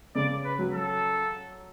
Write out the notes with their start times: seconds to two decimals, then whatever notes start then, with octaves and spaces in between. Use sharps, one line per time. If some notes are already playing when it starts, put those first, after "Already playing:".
0.15 C#3 D5
0.45 B4
0.59 F#3
0.74 A4